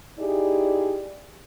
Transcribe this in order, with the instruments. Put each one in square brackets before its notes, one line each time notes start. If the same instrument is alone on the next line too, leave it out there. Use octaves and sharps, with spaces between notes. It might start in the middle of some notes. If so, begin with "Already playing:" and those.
[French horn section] D#4 E4 G4 G#4 D5